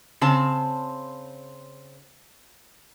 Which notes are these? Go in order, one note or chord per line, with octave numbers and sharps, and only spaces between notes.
C#3 C4 A5